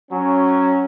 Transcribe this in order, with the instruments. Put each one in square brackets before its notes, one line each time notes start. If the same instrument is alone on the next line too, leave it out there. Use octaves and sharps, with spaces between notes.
[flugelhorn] F#3 [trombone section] C#4